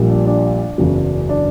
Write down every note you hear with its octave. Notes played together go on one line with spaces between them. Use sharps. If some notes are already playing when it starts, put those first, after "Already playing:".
Already playing: A#1 A#2 G3
D4
D4
F#1 E2 C#3 F#3
D4